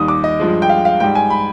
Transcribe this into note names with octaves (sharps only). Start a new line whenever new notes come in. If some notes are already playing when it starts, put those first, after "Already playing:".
Already playing: D#2 D#3 G3 D#6
D6
D#5
G2 F3 G#3
G5
F5
F5
G#2 G3 G5
G#5
B5